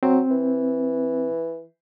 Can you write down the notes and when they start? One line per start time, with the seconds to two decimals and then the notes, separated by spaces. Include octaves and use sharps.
0.03 F#3 C4
0.31 E3